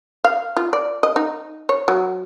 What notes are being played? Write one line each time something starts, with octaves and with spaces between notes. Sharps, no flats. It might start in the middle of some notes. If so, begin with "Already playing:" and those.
F5
F4
D5
D#5
D#4
C#5
F#3